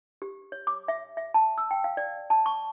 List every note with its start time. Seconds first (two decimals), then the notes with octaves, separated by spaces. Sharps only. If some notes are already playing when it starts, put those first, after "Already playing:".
0.22 G4
0.52 C#5
0.67 D6
0.88 E5
1.17 E5
1.34 A5
1.58 E6
1.71 G5
1.84 F5
1.97 D5
2.30 A5
2.46 C#6